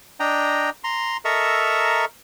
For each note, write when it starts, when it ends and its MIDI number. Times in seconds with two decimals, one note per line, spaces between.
0.20 0.70 62
0.20 0.70 75
0.20 0.70 79
0.20 0.70 82
0.84 1.17 82
0.84 1.17 84
1.25 2.05 69
1.25 2.05 70
1.25 2.05 75
1.25 2.05 76
1.25 2.05 82
1.25 2.05 85